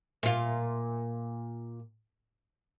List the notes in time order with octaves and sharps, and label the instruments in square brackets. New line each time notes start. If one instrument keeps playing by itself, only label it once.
[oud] A#2 F4